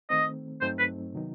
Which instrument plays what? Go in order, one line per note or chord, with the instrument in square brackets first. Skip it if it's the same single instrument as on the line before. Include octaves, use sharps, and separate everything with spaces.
[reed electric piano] D#3 A3 C4 [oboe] D#5
[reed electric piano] G2 F#3 A3 C4 D#4 [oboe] C5
[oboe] B4
[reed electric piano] C3 D#3 F#3 B3 D#4